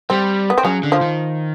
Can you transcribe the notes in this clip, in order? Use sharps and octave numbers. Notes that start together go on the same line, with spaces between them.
G3 C4
B3
C4
C#3 F#3 C#4
D3
F3 F4
D#3